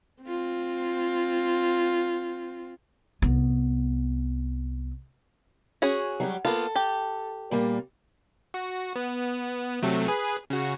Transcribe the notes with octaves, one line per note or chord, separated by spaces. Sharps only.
C4 F4
C2 B3
C#4 F#4 G#4
F#3 G3 G4
A#3 B3 F4 A4
G4
A#2 G3 A#3
F#4
B3
C3 F#3 A3
G#4 B4
C#3 F#4